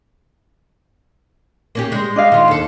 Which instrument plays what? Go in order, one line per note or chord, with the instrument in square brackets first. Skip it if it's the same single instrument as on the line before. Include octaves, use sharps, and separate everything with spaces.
[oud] A#3 C#4 G4
G3 G#3
[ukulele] D4 D#5 F5
[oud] D#3 F4
D#2 A4